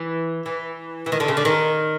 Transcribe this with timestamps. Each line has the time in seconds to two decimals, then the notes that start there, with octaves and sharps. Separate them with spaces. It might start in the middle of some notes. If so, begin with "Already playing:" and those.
Already playing: E3
0.46 E3
1.06 E3
1.12 D#3
1.20 D3
1.28 C#3
1.37 D3
1.45 D#3